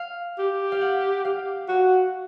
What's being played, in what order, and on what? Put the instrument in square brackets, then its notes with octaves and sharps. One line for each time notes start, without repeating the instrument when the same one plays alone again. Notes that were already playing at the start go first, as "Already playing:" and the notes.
Already playing: [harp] F5
[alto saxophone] G4
[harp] F5
F#5
F5
[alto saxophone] F#4